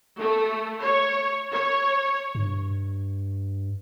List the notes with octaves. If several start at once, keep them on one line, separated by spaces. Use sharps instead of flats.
A3
C#5
C#5
G2